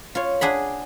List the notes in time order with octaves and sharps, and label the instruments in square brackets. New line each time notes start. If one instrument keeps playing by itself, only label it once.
[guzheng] F4 C#5
D4 G#4 F#5 B5